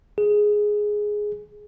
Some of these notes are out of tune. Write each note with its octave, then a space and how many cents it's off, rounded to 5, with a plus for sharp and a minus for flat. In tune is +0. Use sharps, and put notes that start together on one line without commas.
G#4 +5